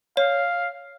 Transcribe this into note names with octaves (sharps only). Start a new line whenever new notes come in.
C#5 F5